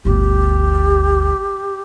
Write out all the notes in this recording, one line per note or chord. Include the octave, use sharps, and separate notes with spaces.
G1 D2 G4